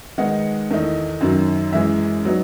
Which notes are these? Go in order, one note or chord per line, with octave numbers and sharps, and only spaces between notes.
D#3 G#3 B3 D#4 F#5
E2 D#3 A3 D#4
F#2 D#3 F#3
F#2 E3 G#3 E5
F#3 B3 D#4